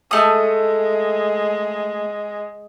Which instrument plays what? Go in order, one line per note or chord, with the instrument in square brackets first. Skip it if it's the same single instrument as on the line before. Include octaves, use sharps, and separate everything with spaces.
[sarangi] G#3 [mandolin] A3 D#6